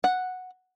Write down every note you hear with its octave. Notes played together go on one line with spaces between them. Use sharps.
F#5